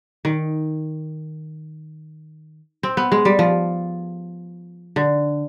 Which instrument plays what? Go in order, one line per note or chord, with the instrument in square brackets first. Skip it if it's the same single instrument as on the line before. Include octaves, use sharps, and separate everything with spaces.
[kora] D#3
C4
B3
G#3
G3
F3
D3